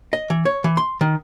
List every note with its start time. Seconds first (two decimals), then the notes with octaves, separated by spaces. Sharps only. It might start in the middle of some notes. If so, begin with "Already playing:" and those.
0.13 D#5
0.30 E3
0.45 C#5
0.64 E3
0.77 C6
1.01 D#3